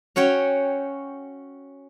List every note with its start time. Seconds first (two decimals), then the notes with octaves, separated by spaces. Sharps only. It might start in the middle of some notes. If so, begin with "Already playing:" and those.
0.16 C#4 F#4 C#5 G5